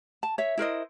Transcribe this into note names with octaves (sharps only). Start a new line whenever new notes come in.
A5
C#5 E5
E4 A#4 C5 D#5